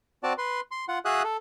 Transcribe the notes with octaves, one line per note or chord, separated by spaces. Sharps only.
C4 F#4 D5 A5
B4 C6
C6
F4 F#5
F#4 G#4 E5 F5 D#6 F#6
A4